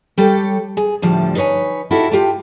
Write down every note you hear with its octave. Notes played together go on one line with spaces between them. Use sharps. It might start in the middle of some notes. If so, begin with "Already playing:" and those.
G3 G4 A4 C#5
G#4
D2 A2 F3 G3 D5 A5
D#4 A#4 B4 C#5 G#5
D#4 E4 F#4 G4 A4 A#4
F4 G4 G5 A5